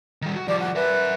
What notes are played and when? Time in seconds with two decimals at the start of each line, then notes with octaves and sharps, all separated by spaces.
0.22 D#3 G3
0.36 F#4
0.48 F3 G3 D5
0.60 F#5
0.75 A#4 B4 E5